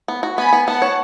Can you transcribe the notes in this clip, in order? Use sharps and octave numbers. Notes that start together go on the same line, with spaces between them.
B3
F#4
B3 G#5 B5
B3
B3 F#5 A5
C#5